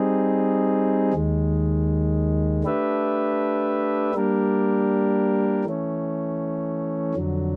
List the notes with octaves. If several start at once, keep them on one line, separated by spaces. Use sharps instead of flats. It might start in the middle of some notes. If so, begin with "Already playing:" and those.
Already playing: G3 C4 D#4 G#4
D#2 D#3 G#3
A3 D4 G4 B4 E5
G3 A#3 D4 G4 A#4
E3 A3 C#4
F2 D3 F#3